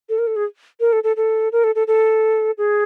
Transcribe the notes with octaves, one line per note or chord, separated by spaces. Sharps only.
A4
A#4
A4
G#4
A#4
A4
A4
A4
A#4
A4
A4
A4
G#4